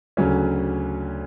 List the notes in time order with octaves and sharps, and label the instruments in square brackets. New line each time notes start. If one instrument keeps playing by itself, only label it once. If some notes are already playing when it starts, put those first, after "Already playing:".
[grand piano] D2 C#3 F#3 C#4